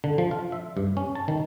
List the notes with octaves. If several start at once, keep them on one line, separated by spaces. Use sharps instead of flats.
D3
F3
F4
E5
G2
C#4
A5
D#3